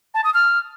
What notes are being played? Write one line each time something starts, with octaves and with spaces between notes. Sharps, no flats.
A5
D#6
F6